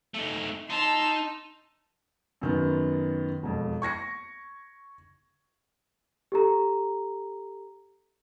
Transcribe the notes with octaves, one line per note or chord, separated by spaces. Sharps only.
A3 D#4
D#4 A5 C6 E6
F#2 D#3 B3
E1 F2
C#6 G#6 A#6 C#7
G4 A4 A#5